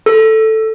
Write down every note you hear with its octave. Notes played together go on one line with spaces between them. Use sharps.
A4